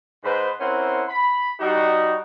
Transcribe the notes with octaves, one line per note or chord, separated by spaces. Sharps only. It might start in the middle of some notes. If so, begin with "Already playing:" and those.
G#2 B4 C5
C4 C#4 E4 A#4 C5 F#5
B5
G3 D#4 F#4